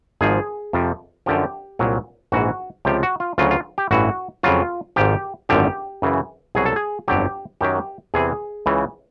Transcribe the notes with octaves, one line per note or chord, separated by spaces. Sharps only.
G#1 G#2 F3 G#4
F2 C3 F3
F#2 D3 F3 G4
C2 A#2 F#3
A#1 G#2 E3 F#4
C#2 C3 F3 G4
F#4
F4
D2 C#3 F#3 F4
F4
G4
A1 G2 E3 F#4
F2 C#3 F#3 F4
G#1 G#2 F3 G4
G#1 F#2 D3 F3 G4
F#2 C#3 E3
C2 B2 F#3 G#4
A4
G#4
G1 F2 D3 F#3 G4
F#2 D#3 F#3 G4
E2 C3 E3 G#4
C#2 C#3 E3